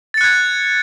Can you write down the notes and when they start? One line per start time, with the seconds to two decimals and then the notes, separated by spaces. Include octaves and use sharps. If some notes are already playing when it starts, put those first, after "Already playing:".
0.14 A6
0.18 C#7
0.21 F#6
0.24 G#6